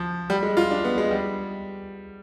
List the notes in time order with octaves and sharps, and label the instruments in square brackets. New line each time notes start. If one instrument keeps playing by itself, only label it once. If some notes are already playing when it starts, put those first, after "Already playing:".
Already playing: [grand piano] F3
G3
G#3
F4
D4
B3
G#3
G3